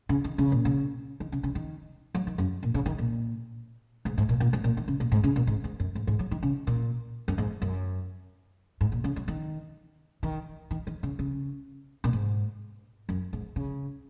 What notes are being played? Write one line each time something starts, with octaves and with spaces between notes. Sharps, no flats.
C#3
D#3
C#3
A#2
C#3
D#3
C#3
C#3
D#3
F#3
D#3
F#2
A#2
C#3
D#3
A#2
G#2
G#2
A#2
A#2
G#2
A#2
D#3
C#3
A#2
G#2
C#3
A#2
G#2
G#2
F#2
G#2
G#2
F#3
D#3
C#3
A#2
F#2
G#2
F#2
G#2
A#2
C#3
F#3
D#3
D#3
D#3
D#3
C#3
C#3
A#2
G#2
F#2
G#2
C#3